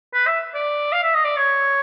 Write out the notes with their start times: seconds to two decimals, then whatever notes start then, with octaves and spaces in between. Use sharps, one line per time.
0.14 B4
0.27 E5
0.55 D5
0.92 F5
1.03 E5
1.14 D#5
1.24 D5
1.36 C#5